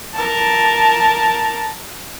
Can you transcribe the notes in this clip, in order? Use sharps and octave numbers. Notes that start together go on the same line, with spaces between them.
A#4 A5